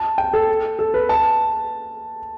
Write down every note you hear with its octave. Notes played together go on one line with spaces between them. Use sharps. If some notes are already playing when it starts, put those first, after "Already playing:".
Already playing: A5
G5
A4
A4
B4
A5